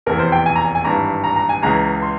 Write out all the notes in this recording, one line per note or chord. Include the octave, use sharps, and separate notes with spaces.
F1 E2 E3 A#4
C5
G5
G#5
A#5
G#5
G#5
G#1 G2 E3 A#5
A#5
A#5
G#5
C#2 C#3 E3 G#3 A#5
C6